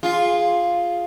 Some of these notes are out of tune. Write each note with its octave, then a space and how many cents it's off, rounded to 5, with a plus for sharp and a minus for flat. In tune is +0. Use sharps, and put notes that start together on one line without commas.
F4 +0 G#4 +0